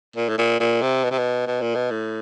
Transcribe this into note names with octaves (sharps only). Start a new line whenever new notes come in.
A#2
A2
A#2
A#2
C3
B2
C3
B2
B2
A#2
B2
A2